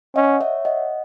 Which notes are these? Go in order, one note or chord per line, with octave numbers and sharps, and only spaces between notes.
C#4 D#5 F#5
C#5 E5
D#5 F#5